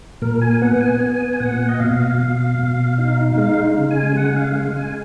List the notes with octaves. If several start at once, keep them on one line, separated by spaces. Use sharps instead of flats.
A#2 A#4
G#5
B3 F#5
G#5
B3 G#5
G#5
A#2 F#5
D#5
B2 F5
B2
B2
D#4
G#3 F5
C#3
G#5
G#3 F#5
F5
G#3
G#5